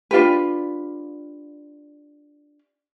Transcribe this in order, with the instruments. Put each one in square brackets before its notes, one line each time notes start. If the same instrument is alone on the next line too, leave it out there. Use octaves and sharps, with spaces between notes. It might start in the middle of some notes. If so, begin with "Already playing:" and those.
[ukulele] D4 F4 G4 B4